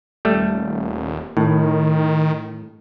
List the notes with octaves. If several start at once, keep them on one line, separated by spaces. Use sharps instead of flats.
D#1 G3 A3
A2 D#3